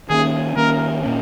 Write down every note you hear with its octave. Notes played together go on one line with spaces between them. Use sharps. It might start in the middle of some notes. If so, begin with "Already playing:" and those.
D#3 A#3 C#4 G#4
D#3 A#3 C#4 A#4
A#2 A#3 C#4